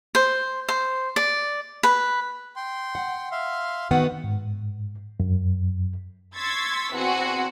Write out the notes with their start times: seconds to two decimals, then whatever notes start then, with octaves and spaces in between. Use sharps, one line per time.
0.15 C5
0.69 C5
1.16 D5
1.83 B4
2.56 G5 C6
2.95 F#5
3.31 E5 F5 C6
3.91 D#3 B3 F#4 F#5
4.24 G#2
5.20 F#2
6.35 C6 C#6 E6 G#6 A6 B6
6.93 E2 C4 F#4 F#5 G#5